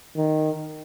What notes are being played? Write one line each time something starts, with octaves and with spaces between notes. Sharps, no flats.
D#3